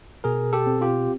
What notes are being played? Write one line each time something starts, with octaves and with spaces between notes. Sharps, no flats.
B2 G#4 A#4
G4 A4
C4
F4 G4